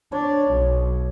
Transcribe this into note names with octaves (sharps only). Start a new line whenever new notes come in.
D4 C#5
B1